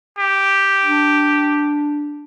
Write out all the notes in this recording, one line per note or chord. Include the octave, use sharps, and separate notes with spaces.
G4
D4